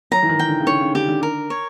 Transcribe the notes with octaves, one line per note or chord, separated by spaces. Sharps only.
F#3 A#5
E3
D#3
G5
D3
C#3
D3 C#5
C#3
D3 G4
D3
A#4
C#5